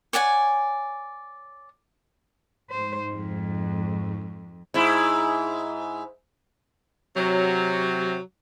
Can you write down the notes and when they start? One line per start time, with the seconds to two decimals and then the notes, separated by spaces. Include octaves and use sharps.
0.13 C#5 D5 F#5 G#5
2.70 G#2 C5
3.12 F2
4.74 G#2 E4
7.17 C3 F#3